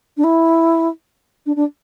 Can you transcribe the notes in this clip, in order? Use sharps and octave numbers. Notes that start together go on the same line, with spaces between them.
D4
E4
D4
D4